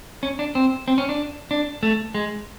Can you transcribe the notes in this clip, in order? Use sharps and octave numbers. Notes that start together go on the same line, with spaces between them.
C#4
D4
C4
C4
C#4
D4
D4
A3
G#3